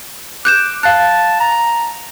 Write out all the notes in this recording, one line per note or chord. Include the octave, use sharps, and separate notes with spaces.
D6 F#6 G6 E7
F5 A5 F#6
A#5